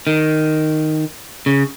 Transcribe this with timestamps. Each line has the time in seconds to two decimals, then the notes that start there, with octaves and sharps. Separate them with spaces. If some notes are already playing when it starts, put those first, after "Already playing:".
0.07 D#3
1.46 C#3